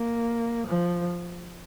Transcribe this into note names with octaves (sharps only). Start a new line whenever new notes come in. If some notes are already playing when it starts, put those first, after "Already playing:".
Already playing: A#3
F3